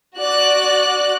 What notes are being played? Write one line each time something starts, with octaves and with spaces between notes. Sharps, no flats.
F#4 D5 F#6